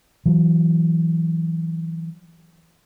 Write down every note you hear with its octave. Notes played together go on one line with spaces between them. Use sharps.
E3 F#3